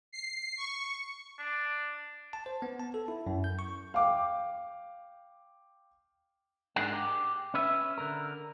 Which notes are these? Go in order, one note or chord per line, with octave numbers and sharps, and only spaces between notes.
C7
C#6
D4
A5
C5
B3
A5
A4
E4
F#2
G6
C#6
F5 G5 D6
G#2 D4 G#4 A#4 F#5
G4
C#4 B4 E5
D3 A#4